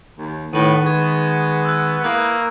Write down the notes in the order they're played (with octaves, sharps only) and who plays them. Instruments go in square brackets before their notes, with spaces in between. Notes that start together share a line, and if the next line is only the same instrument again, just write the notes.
[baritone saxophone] D#2
[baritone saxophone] A2 [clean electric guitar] D#3 B4 [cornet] B3 [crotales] D#7
[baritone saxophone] G#3 [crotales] C#6 G#6
[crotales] E6 F#6
[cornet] A#3 [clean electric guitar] E4 B4 [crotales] D#6